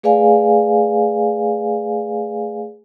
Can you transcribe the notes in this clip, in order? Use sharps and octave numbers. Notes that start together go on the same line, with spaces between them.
A3 G#4 B4 D5 F5 G#5